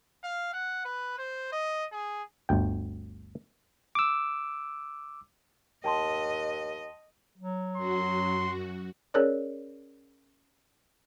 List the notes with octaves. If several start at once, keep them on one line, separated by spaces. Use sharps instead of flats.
F5
F#5
B4
C5
D#5
G#4
G1 D2 G5
D6 E6
D#2 D#5 G5 A5 C6
F#3
F#2 F#4 C6
C#4 G#4 A#4 C#5 D5